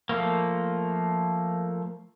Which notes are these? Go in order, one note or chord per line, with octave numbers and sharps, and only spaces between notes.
F3 A3 A#3